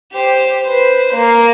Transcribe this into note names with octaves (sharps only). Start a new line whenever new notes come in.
G4 C5
B4 C5
A#3